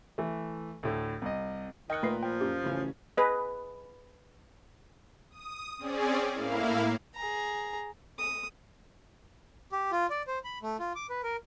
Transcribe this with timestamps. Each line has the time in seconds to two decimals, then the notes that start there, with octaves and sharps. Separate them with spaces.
0.18 E3 A3
0.83 D2 A2
1.22 C2 D#5
1.90 D#3 D#5 G5 F#6 C#7
2.03 A#2 A3 A#4 B4 C7
2.23 F3 G5
2.41 F#2 G4
2.63 A1 C#3 C#4
3.17 G#4 B4 D#5
5.30 D#6
5.79 C4 C#4 G#4 D5
6.33 A2 A#3 E4 F5
7.16 G#4 A#5
8.18 D#6
9.72 G4
9.92 F4
10.10 D5
10.27 C5
10.44 B5
10.62 A3
10.79 F4
10.96 D6
11.10 B4
11.23 A#4